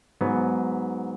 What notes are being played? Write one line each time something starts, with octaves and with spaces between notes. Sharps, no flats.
G#2 F#3 B3